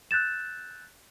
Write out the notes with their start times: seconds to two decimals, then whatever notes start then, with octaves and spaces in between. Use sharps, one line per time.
0.11 E6 F#6 G6 A6 E7